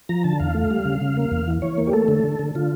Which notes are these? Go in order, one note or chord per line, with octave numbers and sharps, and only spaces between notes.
F3 A#5
D3 A5
E2 F5
A3
G3
C#3
C#3
A#3
E2
E3
E3 C#5
A#3
G4
A3 A4
D3
D3
D3
D3 F4